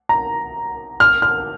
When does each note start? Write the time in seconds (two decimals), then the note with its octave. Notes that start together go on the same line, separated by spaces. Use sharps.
0.09 A#5
1.00 F6
1.22 F6